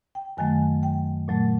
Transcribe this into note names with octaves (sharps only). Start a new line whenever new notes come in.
G5
F#2 D#3 F#3 A3 G#5
G5
A#2 F#3 A3